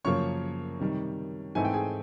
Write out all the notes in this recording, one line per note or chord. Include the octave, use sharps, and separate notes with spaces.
F#2 C#3 F3 A#3 C#5 C#6
C3 D#3 G3
G#2 E3 A3 C4 D#4 G#5
G5
G#4 G#5